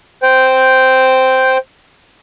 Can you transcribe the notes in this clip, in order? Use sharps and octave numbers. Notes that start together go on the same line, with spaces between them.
C5 G5